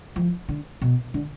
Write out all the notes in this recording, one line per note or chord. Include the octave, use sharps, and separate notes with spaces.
F3
D3
B2
D3